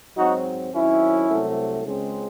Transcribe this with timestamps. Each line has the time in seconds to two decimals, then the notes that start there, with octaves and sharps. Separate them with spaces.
0.16 G#2 F#3 C4 D#4 F#4
0.72 F#2 D#3 F#3 C4 C#4 E4
1.29 C2 C3 F#3 A3 C4
1.84 C#2 C#3 G#3 C4